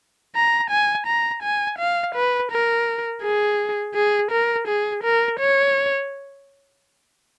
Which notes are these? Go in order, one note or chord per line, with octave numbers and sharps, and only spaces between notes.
A#5
G#5
A#5
G#5
F5
B4
A#4
G#4
G#4
A#4
G#4
A#4
C#5